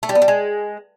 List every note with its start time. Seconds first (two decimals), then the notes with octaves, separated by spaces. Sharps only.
0.03 A3
0.09 G3
0.15 B3
0.22 G3
0.28 G#3